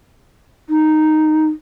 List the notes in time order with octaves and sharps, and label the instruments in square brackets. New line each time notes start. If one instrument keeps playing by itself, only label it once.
[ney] D#4